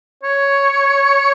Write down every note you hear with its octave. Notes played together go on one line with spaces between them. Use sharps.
C#5